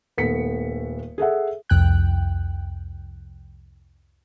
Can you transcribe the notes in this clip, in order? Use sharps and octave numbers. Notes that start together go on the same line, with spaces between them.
D#1 A3 B3 B6 C#7
G#4 A4 E5 F#5
C2 F2 G5 F#6